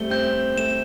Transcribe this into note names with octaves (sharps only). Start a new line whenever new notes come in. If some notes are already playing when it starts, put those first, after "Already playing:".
Already playing: G3 A3 C4 G7
C4 G6
A3 E7